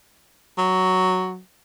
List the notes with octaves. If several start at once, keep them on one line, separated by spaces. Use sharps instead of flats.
F#3